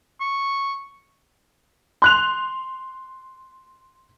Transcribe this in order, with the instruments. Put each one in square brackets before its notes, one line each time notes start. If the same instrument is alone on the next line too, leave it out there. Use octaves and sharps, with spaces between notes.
[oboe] C#6
[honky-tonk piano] C6 F#6 F7